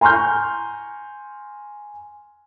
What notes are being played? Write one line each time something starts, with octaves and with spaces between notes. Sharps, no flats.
G#5 A#5 C6 C#6 F6 G6